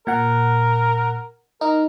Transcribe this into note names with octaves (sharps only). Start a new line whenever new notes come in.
A#2 A#4 F#5
D#4 A#4